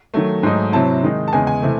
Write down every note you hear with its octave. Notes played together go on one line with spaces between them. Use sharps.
D#3 F#3 A3
G#2 F#3 A3 D#4
C3 F#3 C4 E4 A5
D#3 G#3 D#4
A5
E2 C#3 G#3 G#5
G#5
C3 E3 A3 C4